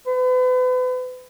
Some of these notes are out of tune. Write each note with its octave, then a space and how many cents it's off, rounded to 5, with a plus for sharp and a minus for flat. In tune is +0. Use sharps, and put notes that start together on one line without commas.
B4 +40